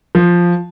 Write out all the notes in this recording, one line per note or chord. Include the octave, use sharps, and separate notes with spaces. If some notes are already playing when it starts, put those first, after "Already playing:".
F3